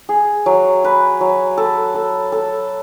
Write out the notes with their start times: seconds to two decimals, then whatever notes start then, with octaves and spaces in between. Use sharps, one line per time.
0.09 G#4
0.46 F#3
0.84 B4
1.21 F#3
1.57 A4
1.95 A4
2.32 A4